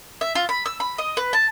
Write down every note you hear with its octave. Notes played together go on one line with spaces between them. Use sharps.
E5
F4
B5
E6
B5
D#5
B4
A5